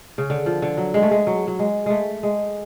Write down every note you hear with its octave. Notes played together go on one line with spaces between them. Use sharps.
C#3
D3
F3
D3
F#3
G#3
A3
G#3
F#3
F#3
G#3
G#3 A3
G#3